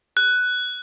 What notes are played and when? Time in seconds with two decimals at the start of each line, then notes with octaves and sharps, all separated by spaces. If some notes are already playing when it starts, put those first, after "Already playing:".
0.17 F#6